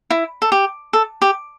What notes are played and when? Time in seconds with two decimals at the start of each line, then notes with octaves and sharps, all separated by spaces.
0.10 E4
0.42 A4
0.52 G4
0.93 A4
1.22 G4